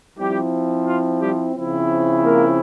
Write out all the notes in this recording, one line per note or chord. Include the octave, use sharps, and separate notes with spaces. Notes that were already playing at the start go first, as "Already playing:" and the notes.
F3 G3 C4 E4 G4
F4
G3 G4
C#3 F3 C4 E4
A#3 A#4